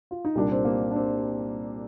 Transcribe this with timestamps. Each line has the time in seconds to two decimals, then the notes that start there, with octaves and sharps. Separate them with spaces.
0.11 F4
0.25 D#4
0.35 C2 A#2 G3 D4
0.51 C4
0.65 A#3
0.91 D4
0.96 C4